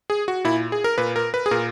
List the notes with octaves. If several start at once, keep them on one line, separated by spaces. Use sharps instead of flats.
G#4
F#4
A#2 E4
G#4
A#4
A#2 B4
A#4
B4
G#4
A#2 A#4